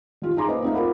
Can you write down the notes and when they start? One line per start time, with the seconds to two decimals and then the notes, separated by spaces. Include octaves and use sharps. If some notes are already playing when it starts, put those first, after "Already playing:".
0.22 D#3 F4 G4
0.36 D#4 G#4 A#5 C6 D6
0.48 A#3 B4 C5 D#5
0.62 A3 C4 D#4 A4 C5 F5
0.74 F4 A#4 F#5 B5